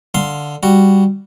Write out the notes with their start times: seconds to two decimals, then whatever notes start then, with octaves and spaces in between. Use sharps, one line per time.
0.15 D3 F5 C6
0.63 G3 F#4